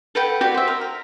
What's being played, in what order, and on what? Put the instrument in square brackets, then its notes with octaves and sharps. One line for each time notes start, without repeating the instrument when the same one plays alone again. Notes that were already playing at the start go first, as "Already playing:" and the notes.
[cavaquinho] A4 B4 F#5 G5
F#4 G4 B4 D5
C5 E5
A#4
A#4